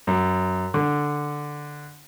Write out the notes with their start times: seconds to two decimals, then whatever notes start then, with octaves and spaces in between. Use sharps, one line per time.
0.07 F#2
0.74 D3